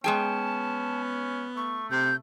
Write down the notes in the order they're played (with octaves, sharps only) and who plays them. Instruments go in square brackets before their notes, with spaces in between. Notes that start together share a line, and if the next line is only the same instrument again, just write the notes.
[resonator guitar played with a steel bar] G#3 G#4 G5 [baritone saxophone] B3 [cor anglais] C#4 [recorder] A5
[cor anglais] A3 [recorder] C#6
[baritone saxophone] C3 [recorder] G6